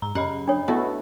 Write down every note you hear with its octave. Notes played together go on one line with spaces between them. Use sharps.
G#2 A#5
F#2 C#3 C#4 D#5 F#5 B5
D4 C#5
A3 B3 E4 F#4